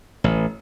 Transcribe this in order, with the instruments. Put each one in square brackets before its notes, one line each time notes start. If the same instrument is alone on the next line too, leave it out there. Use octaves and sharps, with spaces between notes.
[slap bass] A1